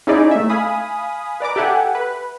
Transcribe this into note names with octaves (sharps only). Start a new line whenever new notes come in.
C#4 D#4 E4 G#4 D5 D#5
A3 E5
F5 G#5 B5 D#6
B4 D5 A#5 D6
G4 A4 E5 F#5 G#5
B4